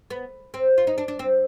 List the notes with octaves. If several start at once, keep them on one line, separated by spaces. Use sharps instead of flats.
B3
C4
F4
D#4
D4
D4
C4